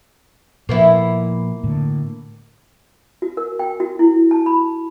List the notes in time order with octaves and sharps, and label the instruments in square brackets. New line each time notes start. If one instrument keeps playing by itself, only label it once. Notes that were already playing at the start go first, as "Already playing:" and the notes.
[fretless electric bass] A#2 F3 [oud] A#3 B3 E4
[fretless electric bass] A2 D3
[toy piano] F#4
A#4
G5
F#4
E4
A5
B5